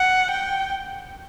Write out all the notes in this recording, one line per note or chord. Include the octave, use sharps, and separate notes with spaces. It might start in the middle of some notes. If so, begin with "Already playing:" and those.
Already playing: F#5
G5